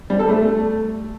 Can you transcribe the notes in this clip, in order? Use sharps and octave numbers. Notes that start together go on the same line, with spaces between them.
G3
A4
A3